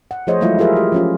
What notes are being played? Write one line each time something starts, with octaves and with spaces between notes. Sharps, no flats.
F#5
F3 A3 G#4 C5 C#5 D#5
E3 F#3 G#3 A3 E4 F4
E4 F4 G4 G#4 A#4 E5
G4
F3 C#4 F4